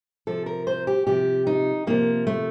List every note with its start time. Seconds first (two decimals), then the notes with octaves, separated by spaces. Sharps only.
0.27 C3 F3 A4
0.46 A#4
0.67 C5
0.87 G4
1.07 C3 F3 G4
1.47 D#4
1.87 C3 F3 A#3
2.27 A3